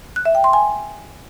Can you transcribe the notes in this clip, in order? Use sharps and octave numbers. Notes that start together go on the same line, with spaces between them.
F#6
E5
G5
C6
G#5